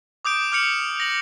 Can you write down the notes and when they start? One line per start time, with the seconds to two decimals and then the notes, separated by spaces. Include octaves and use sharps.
0.25 D6 D#6 G6 D7
0.52 D6 F6 G6 C#7 F7 F#7
1.00 A#6 F#7